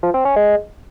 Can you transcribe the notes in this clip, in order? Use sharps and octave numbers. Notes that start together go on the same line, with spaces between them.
F3
C4
C#4
G#3